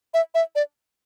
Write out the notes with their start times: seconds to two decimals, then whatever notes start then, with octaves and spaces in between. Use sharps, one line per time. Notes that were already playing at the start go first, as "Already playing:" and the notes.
0.14 E5
0.35 E5
0.55 D5